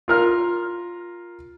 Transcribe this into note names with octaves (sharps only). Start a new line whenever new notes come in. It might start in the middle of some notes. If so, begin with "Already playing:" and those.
F4 A#4 F6